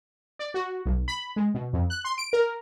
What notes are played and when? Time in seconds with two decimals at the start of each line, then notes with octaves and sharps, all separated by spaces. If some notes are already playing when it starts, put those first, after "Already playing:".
0.39 D5
0.54 F#4
0.86 B1
1.08 B5
1.36 G#3
1.54 B2
1.73 F2
1.90 F#6
2.05 C6
2.18 D7
2.33 A#4